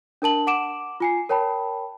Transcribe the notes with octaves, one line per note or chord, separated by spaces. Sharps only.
D4 A#4 A5 F#7
F#5 D6 D7 E7
F4 G#5 C7
A#4 C#5 G5 A5 B5